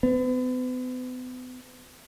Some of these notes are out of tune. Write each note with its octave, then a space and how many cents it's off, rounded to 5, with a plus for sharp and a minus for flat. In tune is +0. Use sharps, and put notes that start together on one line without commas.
B3 +40